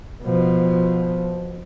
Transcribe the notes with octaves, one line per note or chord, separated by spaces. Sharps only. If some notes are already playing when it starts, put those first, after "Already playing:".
B2 F3